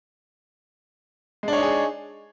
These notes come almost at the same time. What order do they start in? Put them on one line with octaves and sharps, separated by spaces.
G#3 D4 C#5 D#4 G#4